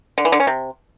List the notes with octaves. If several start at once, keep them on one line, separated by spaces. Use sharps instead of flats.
D3
E3
D3
C#4
C3